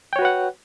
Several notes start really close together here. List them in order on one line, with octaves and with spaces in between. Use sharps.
G5 C#5 F#4 B4 F#5